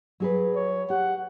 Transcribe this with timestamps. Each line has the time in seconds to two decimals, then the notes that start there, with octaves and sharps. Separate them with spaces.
0.20 F#3 G#4 B4
0.56 C#5
0.90 G4 F#5